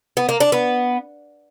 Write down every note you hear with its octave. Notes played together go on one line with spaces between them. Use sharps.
B3
A#3
D4
B3